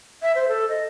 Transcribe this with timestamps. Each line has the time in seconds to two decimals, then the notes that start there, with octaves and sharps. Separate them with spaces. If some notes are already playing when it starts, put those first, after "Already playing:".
0.22 E5
0.35 C5
0.48 A4
0.69 D#5